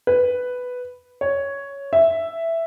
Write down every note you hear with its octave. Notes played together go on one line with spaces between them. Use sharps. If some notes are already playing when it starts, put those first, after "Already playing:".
B4
C#5
E5